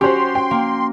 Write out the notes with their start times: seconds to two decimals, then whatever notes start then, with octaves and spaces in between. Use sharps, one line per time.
0.01 C#4 F#4 G4 C5 C6
0.35 G5
0.51 A#3